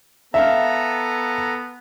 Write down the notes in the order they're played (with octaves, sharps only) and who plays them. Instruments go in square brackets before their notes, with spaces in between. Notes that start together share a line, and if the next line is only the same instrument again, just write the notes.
[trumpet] B3 [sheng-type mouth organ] A4 A#5 [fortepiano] E5 F5